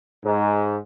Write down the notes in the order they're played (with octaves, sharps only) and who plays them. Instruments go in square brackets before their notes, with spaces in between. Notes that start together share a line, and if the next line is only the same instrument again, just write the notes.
[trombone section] G#2